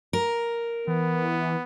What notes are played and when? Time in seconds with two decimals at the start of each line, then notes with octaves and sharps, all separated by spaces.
0.13 A#4
0.88 E3 B3